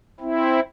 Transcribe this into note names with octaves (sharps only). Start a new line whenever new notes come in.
C4 E4